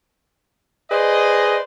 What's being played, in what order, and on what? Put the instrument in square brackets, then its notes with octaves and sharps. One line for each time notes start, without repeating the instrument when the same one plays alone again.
[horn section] G#4 B4 C5 D5 D#5